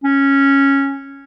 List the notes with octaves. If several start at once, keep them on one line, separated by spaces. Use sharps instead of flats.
C#4